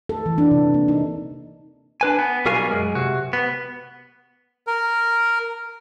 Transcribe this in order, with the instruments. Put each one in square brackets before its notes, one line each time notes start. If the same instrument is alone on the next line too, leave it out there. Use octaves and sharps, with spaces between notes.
[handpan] A4
E3
D4
C3
A#3
D#4
[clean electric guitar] D4 B4 G#5
B3
B1 G3 F#4 A#4 F5 G#5
F#2 G#3
C3 F#4
B3
[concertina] A#4